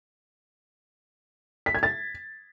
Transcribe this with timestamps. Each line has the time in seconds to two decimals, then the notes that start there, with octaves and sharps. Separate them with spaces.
1.66 B6
1.75 G#6
1.83 A6